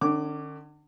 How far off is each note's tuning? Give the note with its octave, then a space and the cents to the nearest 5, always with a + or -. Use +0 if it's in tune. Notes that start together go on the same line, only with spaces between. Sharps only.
D3 +40 C#4 +0 D6 +0